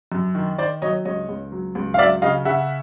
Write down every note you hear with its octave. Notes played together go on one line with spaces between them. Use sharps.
F#2
D#3
D#3 C5 D5
F#3 C#5 D#5
C#2 C#5 D#5
C#2
F#3
C#2
F5
F#3 D5 E5
C#3 D#5 F5
C#3 E5 F#5